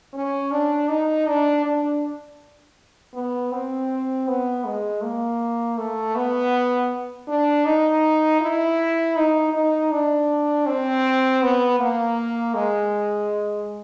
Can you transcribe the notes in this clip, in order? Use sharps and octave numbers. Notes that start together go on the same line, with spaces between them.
C#4
D4
D#4
D4
D4
B3
C4
B3
G#3
A#3
A3
B3
D4
D#4
E4
D#4
D#4
D4
C4
B3
A#3
G#3